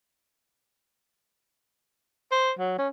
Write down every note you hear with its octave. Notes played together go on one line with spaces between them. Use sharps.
C5
F#3
C#4